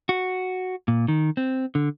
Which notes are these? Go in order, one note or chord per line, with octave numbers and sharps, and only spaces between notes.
F#4
A#2
D#3
C4
D3